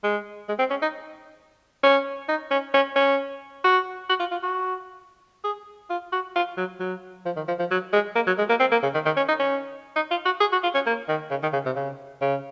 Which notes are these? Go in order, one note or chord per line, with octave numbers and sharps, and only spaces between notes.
G#3
G#3
C4
C#4
D#4
C#4
D#4
C#4
C#4
C#4
F#4
F#4
F4
F4
F#4
G#4
F4
F#4
F4
F#3
F#3
F3
D#3
F3
F3
F#3
G#3
A#3
F#3
G#3
A#3
C4
A#3
C#3
D#3
D#3
C#4
D#4
C#4
D#4
F4
F#4
G#4
F#4
F4
C#4
A#3
D#3
C#3
D#3
C#3
C3
C#3
C#3